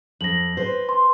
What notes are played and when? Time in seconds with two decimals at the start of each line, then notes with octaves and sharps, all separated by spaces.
0.21 F2 A#6 F#7
0.57 B4 C5
0.89 C6